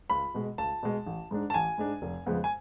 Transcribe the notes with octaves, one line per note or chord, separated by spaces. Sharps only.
C#2 B5
B2 G#3
C#2 A5
B2 G#3
A1
G#2 G#3 D4
A5
A1 G#5
G#2 G#3 D4
F1
F2 C#3 G#3 B3
G#5